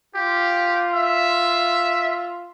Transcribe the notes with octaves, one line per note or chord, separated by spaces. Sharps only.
F4 G4
E5